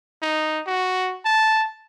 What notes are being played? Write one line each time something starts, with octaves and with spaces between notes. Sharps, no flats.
D#4
F#4
A5